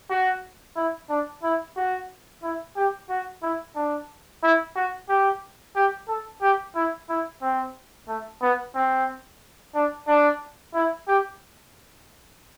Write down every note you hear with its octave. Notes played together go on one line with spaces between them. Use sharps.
F#4
E4
D4
E4
F#4
E4
G4
F#4
E4
D4
E4
F#4
G4
G4
A4
G4
E4
E4
C4
A3
B3
C4
D4
D4
E4
G4